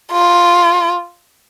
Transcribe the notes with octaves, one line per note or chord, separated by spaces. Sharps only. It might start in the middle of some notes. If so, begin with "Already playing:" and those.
F4